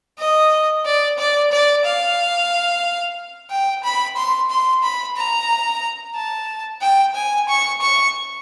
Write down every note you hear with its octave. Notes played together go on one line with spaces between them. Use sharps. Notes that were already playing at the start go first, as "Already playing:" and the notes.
D#5
D5
D5
D5
F5
G5
B5
C6
C6
B5
A#5
A5
G5
G#5
C#6
C#6